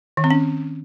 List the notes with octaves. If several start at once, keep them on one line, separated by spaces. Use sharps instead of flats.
D#3
C4
C#4